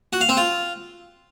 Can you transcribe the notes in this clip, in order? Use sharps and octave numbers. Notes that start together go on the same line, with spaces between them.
F#4
F5
C4
F4